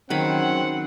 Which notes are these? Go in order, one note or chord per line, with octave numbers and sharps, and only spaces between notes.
D#3 F#3 C4 C#4 G#4 F#5 B5